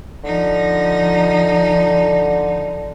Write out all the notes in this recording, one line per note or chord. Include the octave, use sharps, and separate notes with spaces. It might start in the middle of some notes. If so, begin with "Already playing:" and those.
D3 F3 D#4